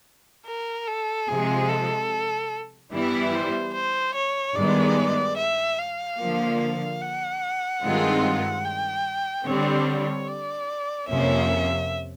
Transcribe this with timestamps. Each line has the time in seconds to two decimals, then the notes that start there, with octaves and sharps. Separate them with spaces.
0.46 A#4
0.88 A4
1.28 C3 F3 G#3 G#4
1.69 A4
2.92 G2 E3 G3 B3 E4
3.33 C5
3.74 C5
4.14 C#5
4.55 G2 D#3 G#3 B3 D5
5.37 E5
5.79 F5
6.18 D3 F3 A#3
6.60 F5
7.01 F#5
7.83 G2 D#3 G#3 C4 F4
8.64 G5
9.46 D3 G3 C4 C#5
10.28 D5
11.09 F2 C3 F3 A#3 C#4 E5